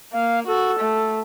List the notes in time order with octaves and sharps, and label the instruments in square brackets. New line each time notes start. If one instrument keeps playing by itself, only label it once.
[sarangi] A#3 [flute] F5
[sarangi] F#4 [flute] A4
[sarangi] A3